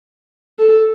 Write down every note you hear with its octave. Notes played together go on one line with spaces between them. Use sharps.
A4